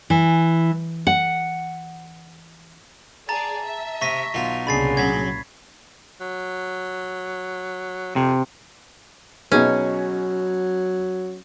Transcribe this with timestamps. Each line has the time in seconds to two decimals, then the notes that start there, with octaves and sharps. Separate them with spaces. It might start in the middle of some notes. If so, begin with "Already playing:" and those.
0.10 E3
1.07 F#5
3.29 G#4 D5 A5 A#5 A6
3.65 E5
4.02 C3 C#6 A#6 B6
4.34 B1 F4
4.67 C2 A#2 C#3 D4 G#4 B5 A6 C7
4.97 F#3 G#6 B6
6.21 F#3
8.16 F2 C3
9.52 B2 F#3 C#4 D#4 G#4